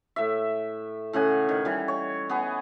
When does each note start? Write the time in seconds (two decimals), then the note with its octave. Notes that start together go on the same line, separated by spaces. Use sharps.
0.16 A2 E5
1.13 A2 C#3 F#5 G#5
1.49 D#3
1.65 E3 G3
1.88 C#5
2.29 B3 G#4